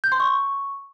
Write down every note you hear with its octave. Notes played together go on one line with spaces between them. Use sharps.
G6
C6
C#6